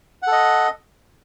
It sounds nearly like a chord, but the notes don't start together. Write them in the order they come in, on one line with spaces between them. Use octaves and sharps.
F#5 A4 D#5